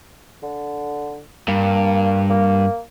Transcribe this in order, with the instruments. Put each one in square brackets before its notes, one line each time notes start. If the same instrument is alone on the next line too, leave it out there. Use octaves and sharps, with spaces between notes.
[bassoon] D3
[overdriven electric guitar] G2 [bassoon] A#3
[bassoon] A#3